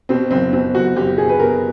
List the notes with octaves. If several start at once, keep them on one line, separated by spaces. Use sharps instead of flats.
B2 C4
F#1 C4
B2 C4
F#1 F#4
F#1 G4
B2 G#4
B4
B2 A#4